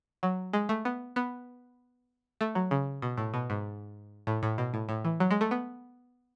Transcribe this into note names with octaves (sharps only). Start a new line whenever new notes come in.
F#3
G#3
A3
B3
B3
A3
F#3
C#3
B2
A2
B2
G#2
A2
A2
B2
A2
A2
E3
F#3
G#3
A3
B3